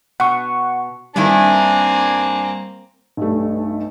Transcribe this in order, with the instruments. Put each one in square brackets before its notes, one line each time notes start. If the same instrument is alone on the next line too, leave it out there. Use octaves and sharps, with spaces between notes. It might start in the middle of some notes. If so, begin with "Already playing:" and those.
[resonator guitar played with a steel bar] B2 [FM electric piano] F#5 C#6
[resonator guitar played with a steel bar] G2 D#3 E4 [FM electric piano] G3 [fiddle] A#3 C4 [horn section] D4 G#5
[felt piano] B1 G2 A3